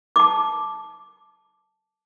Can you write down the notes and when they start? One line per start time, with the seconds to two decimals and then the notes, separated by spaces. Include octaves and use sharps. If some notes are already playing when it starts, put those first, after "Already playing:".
0.16 A5 D6